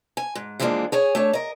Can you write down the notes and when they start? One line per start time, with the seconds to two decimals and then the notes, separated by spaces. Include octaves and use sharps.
0.17 G#5
0.35 G#2
0.60 E3 F3 G#3 A#3 D4
0.92 G#4 C#5 G#5
1.15 A3 D4 C#5
1.33 A#4 D#5